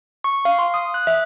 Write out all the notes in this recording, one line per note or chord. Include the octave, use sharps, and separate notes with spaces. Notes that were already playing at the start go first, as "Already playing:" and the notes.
C#6
F5
C6
D#6
F#6
E5